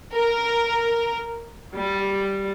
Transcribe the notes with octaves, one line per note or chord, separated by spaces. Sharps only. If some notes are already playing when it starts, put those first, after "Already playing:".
A#4
G3